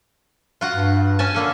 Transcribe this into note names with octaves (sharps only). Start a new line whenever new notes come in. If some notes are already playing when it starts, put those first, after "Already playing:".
F4 F#4 F#5
G2
C#4 G#5 A5
D3 A#3 A4